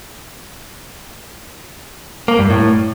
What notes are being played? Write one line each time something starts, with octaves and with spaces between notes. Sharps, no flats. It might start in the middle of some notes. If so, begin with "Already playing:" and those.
A#3
G2
A2